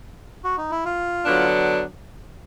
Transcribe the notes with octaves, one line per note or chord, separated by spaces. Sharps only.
F#4
D#4
E4
F4
D3 F#3 B3 D4